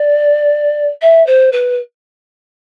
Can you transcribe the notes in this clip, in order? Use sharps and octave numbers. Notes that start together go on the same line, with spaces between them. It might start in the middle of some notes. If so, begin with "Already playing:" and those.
Already playing: D5
E5
C5
B4